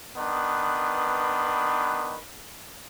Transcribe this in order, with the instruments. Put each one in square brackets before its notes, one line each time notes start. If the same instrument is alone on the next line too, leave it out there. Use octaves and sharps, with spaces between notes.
[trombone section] D#3 B3 D4 B4